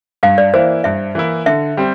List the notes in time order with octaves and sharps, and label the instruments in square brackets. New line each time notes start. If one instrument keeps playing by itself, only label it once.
[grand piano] G2 [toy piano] F5
[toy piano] D5
[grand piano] E3 A#3 E4 [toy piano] C5
[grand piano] G2 [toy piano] E5
[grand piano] E3 A#3 E4
[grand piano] D3 [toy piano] E5
[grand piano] G3 C4